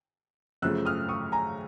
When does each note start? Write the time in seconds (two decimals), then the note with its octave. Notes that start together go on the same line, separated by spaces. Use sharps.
0.62 F#2 C#3 F3 A3 E6 F#6
0.85 D#6 F6
1.09 C#6 D#6
1.32 G#5 A#5